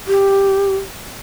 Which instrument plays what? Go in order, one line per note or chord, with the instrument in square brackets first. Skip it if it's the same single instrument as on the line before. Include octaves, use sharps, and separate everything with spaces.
[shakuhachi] G4